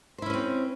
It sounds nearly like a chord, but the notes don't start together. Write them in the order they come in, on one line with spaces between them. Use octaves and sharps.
C5 E4 C#4 B4 C4